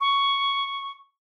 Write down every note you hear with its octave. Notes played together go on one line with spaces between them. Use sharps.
C#6